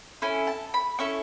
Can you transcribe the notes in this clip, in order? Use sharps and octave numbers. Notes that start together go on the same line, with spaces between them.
C#4 E4 A4 G#5
A5
B5
C#4 E4 A4 C#6